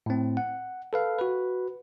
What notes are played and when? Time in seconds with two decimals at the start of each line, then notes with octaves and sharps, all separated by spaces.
0.06 A2 C4
0.37 F#5
0.93 A4 B4 F5
1.19 F#4 B4